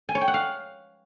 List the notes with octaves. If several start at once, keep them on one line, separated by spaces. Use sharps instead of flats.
G#5
C#5
G5
F#5
F5